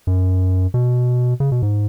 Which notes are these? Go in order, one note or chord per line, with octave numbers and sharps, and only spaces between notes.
F#2
B2
C#3
B2
G#2